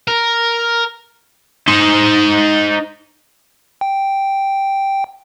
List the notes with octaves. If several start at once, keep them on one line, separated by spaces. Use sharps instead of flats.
A#4
D#4 C5
G5